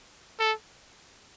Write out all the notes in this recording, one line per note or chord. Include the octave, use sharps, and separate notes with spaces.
A4